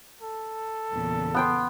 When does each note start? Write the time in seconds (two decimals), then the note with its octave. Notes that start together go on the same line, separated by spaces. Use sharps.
0.21 A4
0.91 E2 A#2 C#3
1.34 B3 G5 C6